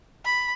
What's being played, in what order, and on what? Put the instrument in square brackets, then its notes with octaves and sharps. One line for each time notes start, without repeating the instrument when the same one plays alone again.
[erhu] B5